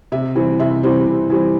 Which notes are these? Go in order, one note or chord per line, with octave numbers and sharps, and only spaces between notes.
C3 E5
E3 G3 C4
C3 E5
E3 G3 C4
C3
E3 G3 C4